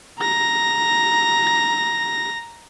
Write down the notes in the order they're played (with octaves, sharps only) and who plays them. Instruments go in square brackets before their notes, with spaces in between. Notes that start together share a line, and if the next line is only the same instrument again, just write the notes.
[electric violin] A#5 A#6